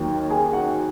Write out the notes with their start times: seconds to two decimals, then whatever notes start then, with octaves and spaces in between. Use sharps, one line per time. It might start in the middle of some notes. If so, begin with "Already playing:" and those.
Already playing: D#2 D#3 F#3
0.30 G#4 G#5
0.53 F#4 F#5